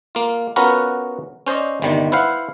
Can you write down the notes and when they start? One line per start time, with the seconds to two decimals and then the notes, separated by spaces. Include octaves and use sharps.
0.15 A#3 F4
0.56 B3 C#4 F4 F#4 A#4 B4
1.47 C#4 C5 D5 D#5
1.82 G1 C3 D#3 G3
2.12 E4 B4 C5 F5 F#5